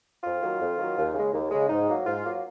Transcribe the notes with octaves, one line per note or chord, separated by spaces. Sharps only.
F2 F4
D#3 F#3 A#3
F2
D#3 F#3 A#3
D#2
C#3 G#3
D#2
C#3 G#3
G#2 D#4
F#3 A#3
G#2 F4
F#3 A#3